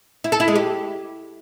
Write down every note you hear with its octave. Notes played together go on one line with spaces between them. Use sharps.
E4
A4
E4
G#3
G4